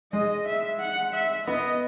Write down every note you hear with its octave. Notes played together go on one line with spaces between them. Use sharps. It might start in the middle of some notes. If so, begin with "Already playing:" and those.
G#3 D#5
E5
F#5
E5
B3 D#5